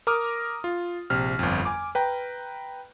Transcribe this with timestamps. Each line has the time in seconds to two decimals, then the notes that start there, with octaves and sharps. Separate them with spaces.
0.07 A#4 A#5 D6 D#6 F6
0.64 F4
1.10 A#1 C3 F6
1.39 G1 F2
1.65 G#5 D6
1.95 B4 G5 A#5